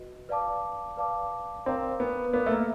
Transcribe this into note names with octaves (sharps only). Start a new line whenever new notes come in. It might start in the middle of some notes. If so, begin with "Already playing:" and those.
Already playing: F#4 B4 D#5
B4 D5 F5 A5 D6
B4 D5 F5 A5 D6
C4 A#4 D5 F5 A#5 D6
B3
B3 A#4 D5 F5 A#5 D6
A3
A#3